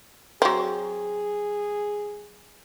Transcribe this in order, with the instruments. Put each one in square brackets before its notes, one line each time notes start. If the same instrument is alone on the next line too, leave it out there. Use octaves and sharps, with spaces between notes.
[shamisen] F#3 C4 [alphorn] G#4